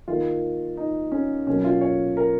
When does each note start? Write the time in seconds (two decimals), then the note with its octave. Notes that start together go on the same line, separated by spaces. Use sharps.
0.08 D#3 A#3 F4
0.77 D#4
1.12 C#4
1.47 B2 F#3 A#3 C#4
1.64 F4
1.81 C#5
2.17 A#4